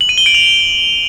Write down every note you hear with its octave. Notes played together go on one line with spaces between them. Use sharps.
F#7
D#7
G7
D7
F7